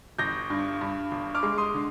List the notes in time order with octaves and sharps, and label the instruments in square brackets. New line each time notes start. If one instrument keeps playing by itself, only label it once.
[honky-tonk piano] G1 [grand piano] G6 A#6
[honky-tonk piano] G2
G2
G1
[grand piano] D6 F6
[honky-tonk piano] G#3
[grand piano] C6 D#6
[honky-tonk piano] D3